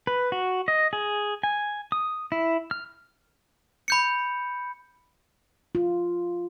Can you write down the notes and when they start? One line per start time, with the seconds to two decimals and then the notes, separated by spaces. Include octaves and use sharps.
0.07 B4
0.32 F#4
0.68 D#5
0.93 G#4
1.43 G#5
1.92 D#6
2.32 E4
2.71 F6
3.88 B5 G6 C#7
5.75 F4